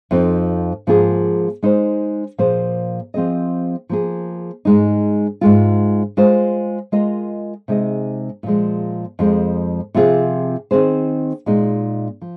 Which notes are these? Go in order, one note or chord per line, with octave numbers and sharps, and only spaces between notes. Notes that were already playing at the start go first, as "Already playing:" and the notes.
F2 F3 C4 D#4
G#2 F3 A#3 F4 G#4
G#3 D#4 C5
A#2 F3 A#3 G#4 C5
F3 C4 G#4 D#5
F3 A#3 G#4
G#2 G#3 D#4
G#2 G#3 F4
G#3 F4 C5
G#3 F4 A#4 D#5
C3 G#3 D#4 G#4 D#5
A#2 F3 G#3
F2 F3 G#3
C3 F3 C4 F4 G#4
D#3 C4 G#4 C5
A#2 G#3 D#4
F3